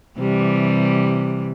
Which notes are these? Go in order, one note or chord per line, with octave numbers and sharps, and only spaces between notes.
C3 E3 G3